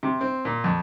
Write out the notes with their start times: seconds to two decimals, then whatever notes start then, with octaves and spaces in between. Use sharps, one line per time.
0.03 C3
0.21 C4
0.45 A#2
0.64 F2